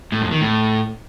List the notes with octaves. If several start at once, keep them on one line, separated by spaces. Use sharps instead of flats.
A2
F2
D#3
A2